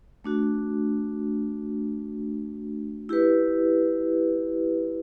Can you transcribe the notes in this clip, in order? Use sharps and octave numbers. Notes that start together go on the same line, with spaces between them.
A3 D4 F#4
E4 G4 B4